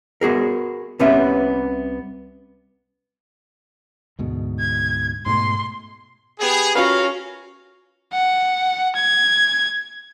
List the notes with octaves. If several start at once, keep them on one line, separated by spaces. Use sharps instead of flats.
B3 F#4 G#4 A#4
C2 C3 B3 C#4 B4 E5
D2 G#2 B2
G#6
G#2 B2 A3 C6
B3 G4 G#4
C#4 F4 F#4 A#4 B4 C#5 F5
F#5
G#6